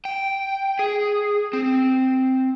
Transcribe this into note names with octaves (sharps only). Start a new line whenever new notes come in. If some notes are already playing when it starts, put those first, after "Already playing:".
G5
G#4
C4